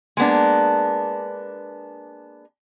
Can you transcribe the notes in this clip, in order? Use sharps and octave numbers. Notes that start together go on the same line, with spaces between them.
G#3 A#3 B3 D4